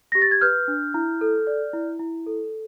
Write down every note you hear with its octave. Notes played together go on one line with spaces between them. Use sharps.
G4 A#6
A6
G#6
B4 F6 G6
D4
E4
A4
D5
E4
E4
A4